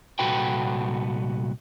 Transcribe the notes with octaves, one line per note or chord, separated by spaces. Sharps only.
C2 A#2 F#4 A4 B4 G5